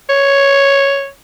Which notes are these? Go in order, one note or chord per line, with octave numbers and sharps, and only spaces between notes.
C#5